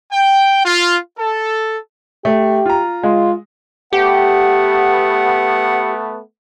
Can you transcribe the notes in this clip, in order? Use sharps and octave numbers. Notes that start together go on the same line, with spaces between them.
G5
F4
A4
A3 G4
F4 A#5
G#3 F4
A3 B3 G4 F#5